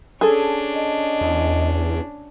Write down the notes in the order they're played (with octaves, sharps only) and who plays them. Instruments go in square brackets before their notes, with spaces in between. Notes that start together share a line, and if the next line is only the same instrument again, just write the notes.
[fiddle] C#4 D4 [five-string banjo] G#4 A4
[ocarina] D#5
[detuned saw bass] E2